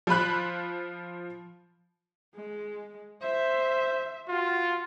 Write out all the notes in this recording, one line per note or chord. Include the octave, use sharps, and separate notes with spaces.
F3 F4 B5 F#6
G#3
C5 E5
F4 F#4